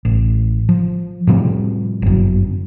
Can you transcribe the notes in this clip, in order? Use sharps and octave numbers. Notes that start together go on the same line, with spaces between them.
A1
F3
A2 C3 F3 G3
G1 F#2